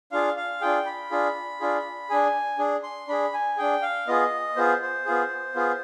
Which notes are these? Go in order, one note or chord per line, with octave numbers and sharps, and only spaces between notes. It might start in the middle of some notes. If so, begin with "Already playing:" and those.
D4 F4 G#4 F5
F5
D4 F4 G#4 G5
B5
D4 F4 G#4
D4 F4 G#4
D4 G#4 G#5
D4 G#4
C6
D4 G#4 B5
G#5
D4 G#4 G5
F5
B3 F4 G#4 D#5
B3 F4 G#4 C5
C5
B3 F4 G#4
B3 F4 G#4